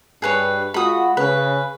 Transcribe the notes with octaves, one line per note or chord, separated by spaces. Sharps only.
G2 G#4 B4 C#5
G#3 F4 F#4 B5 D#6
C#3 B4